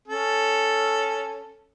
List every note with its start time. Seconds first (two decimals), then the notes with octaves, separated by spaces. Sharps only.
0.08 C#4 A4